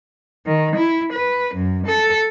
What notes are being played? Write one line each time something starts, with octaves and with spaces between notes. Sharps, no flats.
D#3
E4
B4
F#2
A4